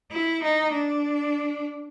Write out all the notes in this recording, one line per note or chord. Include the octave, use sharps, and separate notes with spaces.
E4
D#4
D4